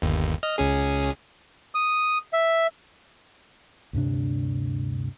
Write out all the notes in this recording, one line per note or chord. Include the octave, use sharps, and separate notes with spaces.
G1 D#2
D#5 F6
C#2 C#4 G#4
D#6
E5
D2 G2 C3 D4